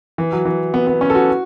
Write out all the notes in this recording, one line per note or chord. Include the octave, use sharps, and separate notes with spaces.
E3
F#3
E3
B3
B3
C#4
A4
F#4